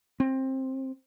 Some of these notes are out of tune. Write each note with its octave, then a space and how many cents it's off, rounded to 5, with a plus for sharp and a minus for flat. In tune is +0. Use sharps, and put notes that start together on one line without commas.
C4 +20